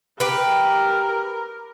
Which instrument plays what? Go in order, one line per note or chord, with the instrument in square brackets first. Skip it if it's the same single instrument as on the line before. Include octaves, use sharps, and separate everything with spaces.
[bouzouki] G4 B4 [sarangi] A#4